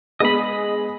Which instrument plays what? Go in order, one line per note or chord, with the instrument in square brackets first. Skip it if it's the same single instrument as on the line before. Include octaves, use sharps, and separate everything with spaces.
[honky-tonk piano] G#3 B3 G#4 [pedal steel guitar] D#5 B5